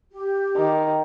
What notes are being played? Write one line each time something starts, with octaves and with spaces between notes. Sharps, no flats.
G4
D#3